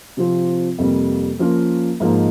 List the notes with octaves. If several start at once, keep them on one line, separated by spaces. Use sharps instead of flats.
C3 F3 C4 F4
F2 C3 G3 A#3
F3 A#3 C#4 F4 A#4
G#2 F3 A#3 D#4